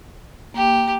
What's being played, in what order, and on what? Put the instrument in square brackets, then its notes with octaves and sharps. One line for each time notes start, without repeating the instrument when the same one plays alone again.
[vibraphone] A#3 G5 [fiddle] G4